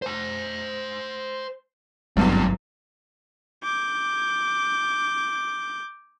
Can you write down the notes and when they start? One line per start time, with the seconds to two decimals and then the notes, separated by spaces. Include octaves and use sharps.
0.02 C5 G#5
2.17 G#1 E2 G2 F#3 G3 A3 C4
3.64 D6 G6